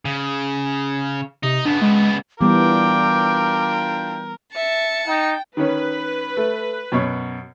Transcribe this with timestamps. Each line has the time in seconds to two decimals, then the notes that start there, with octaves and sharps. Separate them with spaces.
0.05 C#3
1.43 C3 D#4
1.65 C#3 B3 D4
1.82 G#3
2.41 E3 G3 B3 D4 F4 A#4 G5 D6
4.55 E5 A5 C#7
5.07 D#4 G5
5.57 D#3 C#4 B4
6.37 A3
6.92 F#2 B2 C#5